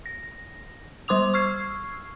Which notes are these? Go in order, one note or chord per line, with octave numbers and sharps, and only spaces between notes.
A#6
G3 C5 C6 D6 D#6 F7
C#6 E6 F6 G#6 C7